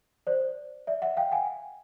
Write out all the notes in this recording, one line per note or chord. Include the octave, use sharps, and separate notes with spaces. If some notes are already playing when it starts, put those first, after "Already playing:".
C5 D5
D5 E5
E5 F#5
F5 G5
F#5 G#5